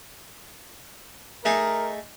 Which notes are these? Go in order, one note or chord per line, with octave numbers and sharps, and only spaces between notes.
A3 D#4 G#4 A#4